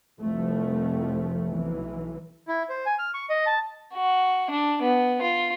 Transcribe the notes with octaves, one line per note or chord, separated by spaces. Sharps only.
F1 C2 F2 F3 A3
B1 E3
E4
C5
G#5
F6
C#6
D#5
A5
F#4
D4
B3
F4